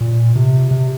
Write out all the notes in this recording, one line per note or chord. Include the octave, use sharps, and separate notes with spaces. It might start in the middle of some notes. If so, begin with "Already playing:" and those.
A#2
C3
C3